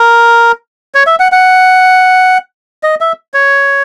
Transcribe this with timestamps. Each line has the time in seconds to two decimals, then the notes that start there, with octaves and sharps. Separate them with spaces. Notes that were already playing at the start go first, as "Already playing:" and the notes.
Already playing: A#4
0.95 C#5
1.07 E5
1.20 F#5
1.32 F#5
2.83 D#5
3.01 E5
3.34 C#5